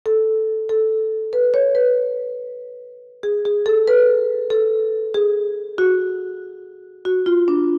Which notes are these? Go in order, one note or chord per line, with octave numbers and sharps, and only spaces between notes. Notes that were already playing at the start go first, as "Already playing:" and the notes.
A4
A4
B4
C#5
B4
G#4
G#4
A4
B4
A4
G#4
F#4
F#4
F4
D4